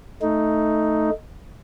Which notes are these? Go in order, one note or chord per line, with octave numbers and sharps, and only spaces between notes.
A3 D#4